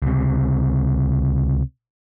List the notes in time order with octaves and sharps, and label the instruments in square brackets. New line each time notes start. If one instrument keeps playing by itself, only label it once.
[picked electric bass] C#2 C3